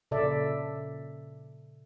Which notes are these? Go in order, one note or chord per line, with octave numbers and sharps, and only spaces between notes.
A#2 C#3 A4 D5 E5